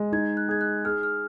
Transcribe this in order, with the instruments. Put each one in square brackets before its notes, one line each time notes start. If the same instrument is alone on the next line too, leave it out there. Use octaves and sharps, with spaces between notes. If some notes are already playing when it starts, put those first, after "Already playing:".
Already playing: [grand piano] G#3
[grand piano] D#4 [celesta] G#6
[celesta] F#6
[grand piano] G#4 [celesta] G#6
[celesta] F#6
[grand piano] G#4 [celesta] F6
[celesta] F6